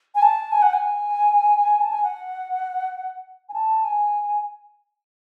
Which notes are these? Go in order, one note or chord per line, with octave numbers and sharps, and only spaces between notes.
G#5
A5
G#5
F#5
G#5
A5
G#5
F#5
G#5
A5
G#5